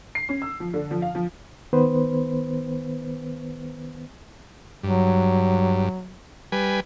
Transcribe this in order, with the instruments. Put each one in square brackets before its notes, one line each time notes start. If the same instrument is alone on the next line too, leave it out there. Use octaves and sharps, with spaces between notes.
[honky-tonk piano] C7
C#4
E6
F3
D3
F3
F5
F3
[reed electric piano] D#3 B3 B4 C5
[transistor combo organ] G2 [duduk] F#3
[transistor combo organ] G3 B4 G#5